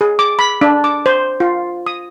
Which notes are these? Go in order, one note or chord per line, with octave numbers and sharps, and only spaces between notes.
G#4
D6
B5
D4
D6
C5
F4
D#6